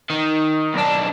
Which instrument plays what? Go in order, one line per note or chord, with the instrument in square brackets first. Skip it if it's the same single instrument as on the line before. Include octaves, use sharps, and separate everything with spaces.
[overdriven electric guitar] D#3
B1 D4